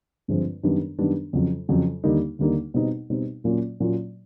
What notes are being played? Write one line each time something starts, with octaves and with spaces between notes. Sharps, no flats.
G2 D3 F3 G#3 C4
F#2 D#3 G3 B3 D4
F#2 D#3 G3 B3 D4
F2 C#3 F#3
F2 C#3 F#3
D#2 D3 G3 A#3 D#4
D#2 D3 G3 A#3 D#4
B2 G3 C4 D#4
B2 G3 C4 D#4
A#2 F#3 A#3 C#4 F4
A#2 F#3 A#3 C#4 F4